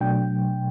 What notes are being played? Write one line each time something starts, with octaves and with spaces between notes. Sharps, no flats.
B2 F#3 A3 D4 G5